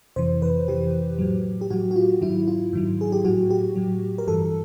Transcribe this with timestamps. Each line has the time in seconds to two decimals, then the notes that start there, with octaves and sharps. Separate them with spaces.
0.16 F2 C3 E3 C5
0.42 B4
0.68 F2 C3 E3 G4
1.19 A2 F#3
1.61 G4
1.70 A2 F#3 F#4
1.91 F#4
1.96 F4
2.21 G#2 D#3 F#3 E4
2.48 F4
2.73 G#2 D#3 F#3
3.01 G#4
3.12 G4
3.25 A2 F#3 F#4
3.51 G4
3.76 A2 F#3
4.18 A#4
4.27 G2 E3 A4